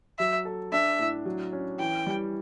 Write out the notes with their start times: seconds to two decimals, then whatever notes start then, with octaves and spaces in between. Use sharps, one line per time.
0.19 F#3 E5
0.45 A4
0.72 D4 E5
0.99 A2
1.25 F#3
1.53 C#4
1.79 E3 G5
2.07 G3